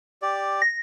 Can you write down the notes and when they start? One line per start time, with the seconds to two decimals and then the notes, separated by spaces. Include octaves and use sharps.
0.22 G4 D5
0.62 A#6